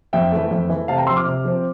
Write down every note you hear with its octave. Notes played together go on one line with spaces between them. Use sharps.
F2 E5 G5
E3 A3
F2
E3 A3
C3 F5 A5
G5 A#5
F3 C4 C6 E6
D6 F6
C3
F3 C4